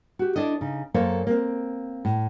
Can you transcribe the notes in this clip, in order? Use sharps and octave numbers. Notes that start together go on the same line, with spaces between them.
F#4 G4
D4 E4 A4 D#5
C#3 D#4
F#2 A#3 A4 C5 C#5 F5
A#3 C4
A2